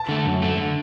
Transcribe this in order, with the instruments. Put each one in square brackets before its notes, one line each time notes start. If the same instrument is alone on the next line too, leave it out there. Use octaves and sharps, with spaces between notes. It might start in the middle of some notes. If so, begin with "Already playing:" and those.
Already playing: [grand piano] A5
[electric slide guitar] D3 A3
F#2
D3 A3
D3